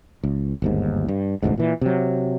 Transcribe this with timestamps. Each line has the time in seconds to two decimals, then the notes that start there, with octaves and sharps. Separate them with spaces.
0.24 C#2
0.62 G1 D#2 G#2
1.08 G2
1.43 E1 A1 D2 G#2
1.58 A#2 E3
1.81 C3 F#3